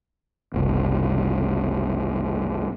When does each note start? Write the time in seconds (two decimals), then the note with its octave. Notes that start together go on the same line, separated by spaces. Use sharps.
0.54 F#1 C2